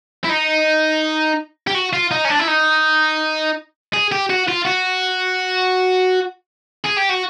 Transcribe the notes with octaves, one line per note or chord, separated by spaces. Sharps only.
E4
D#4
G4
F#4
F4
D#4
C#4
D4
E4
D#4
G#4
G4
F#4
F4
F#4
G#4
G4
F#4